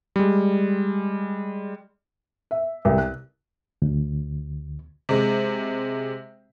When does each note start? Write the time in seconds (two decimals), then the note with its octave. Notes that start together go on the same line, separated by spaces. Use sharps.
0.16 G3 G#3
2.51 E5
2.85 C2
2.98 F#6
3.82 D2
5.09 C3 G#3